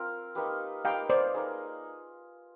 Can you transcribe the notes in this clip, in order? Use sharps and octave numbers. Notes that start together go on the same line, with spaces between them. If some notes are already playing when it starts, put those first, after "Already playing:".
Already playing: C4 F4 A#4
A#3 D#4 G4 B4
A#3 D#4 G4 B4 F5 G5
C5 D5
A#3 D#4 G#4